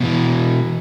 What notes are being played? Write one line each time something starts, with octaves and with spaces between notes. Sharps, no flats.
B2 D#3 E3